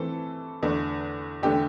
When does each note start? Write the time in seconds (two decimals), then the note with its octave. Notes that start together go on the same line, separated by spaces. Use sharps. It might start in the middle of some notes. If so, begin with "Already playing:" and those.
Already playing: E3 A3 C4 A4
0.63 E2 D3 A3
1.43 E2 D3 A3 G4